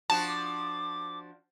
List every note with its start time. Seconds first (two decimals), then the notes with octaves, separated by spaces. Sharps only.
0.10 F3 D4 F#4 A5
0.28 D6